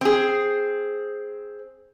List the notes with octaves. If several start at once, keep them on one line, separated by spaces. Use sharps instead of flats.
C4 G#4